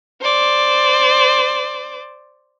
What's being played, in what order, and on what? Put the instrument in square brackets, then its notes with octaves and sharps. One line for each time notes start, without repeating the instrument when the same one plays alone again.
[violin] C5 D5